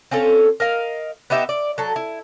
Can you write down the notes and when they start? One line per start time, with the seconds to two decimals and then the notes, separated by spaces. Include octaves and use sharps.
0.11 C4 C#4 F4 A4
0.60 A#4 D#5 F5
1.30 B3 D#4 G4 E5
1.49 D5
1.78 F#3 A4
1.96 E4